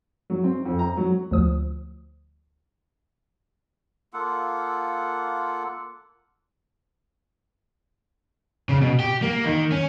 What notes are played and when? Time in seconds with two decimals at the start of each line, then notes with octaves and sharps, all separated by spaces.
0.30 F#3
0.44 C4
0.65 F2
0.79 A#5
0.97 F#3
1.31 D2 F3 D#6
4.13 A#3 F4 A4 F#5
8.69 C#3
8.82 B2
8.99 G4
9.23 A#3
9.45 D#3
9.72 C#4